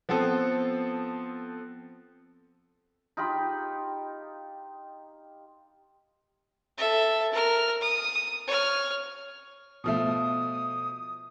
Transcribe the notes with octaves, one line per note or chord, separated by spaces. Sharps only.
F3 B3 C4 A4
D#4 F4 G4 B5
A4 E5
A#4 F6
D#6
C#5 F6
B2 F3 A3 D#6